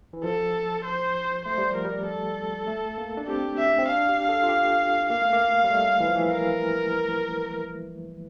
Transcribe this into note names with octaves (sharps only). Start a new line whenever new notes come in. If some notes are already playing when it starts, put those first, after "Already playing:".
E3
F3 A4
C5
A3 C5
G3
F3 A#4
G3
A4
A3
A#3
D4
C4 G4
E5
C4
D4 F5
G4
A4
F4
G4
A#3 F5
A3
A#3
G3
A3
E3
F3
E3
A#4